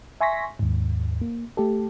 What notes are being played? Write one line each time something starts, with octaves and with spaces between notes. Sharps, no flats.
E5 G#5 C6 C#6 A#6 B6
D#2 G#2
A#3
A3 G4 A4